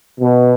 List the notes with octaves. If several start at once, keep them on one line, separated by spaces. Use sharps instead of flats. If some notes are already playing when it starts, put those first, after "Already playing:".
B2